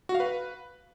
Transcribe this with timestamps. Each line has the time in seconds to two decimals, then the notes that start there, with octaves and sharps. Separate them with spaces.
0.09 F#4
0.15 F5
0.20 B4